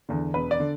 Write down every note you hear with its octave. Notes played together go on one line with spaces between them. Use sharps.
E2 D3
E1 B4
D5
D3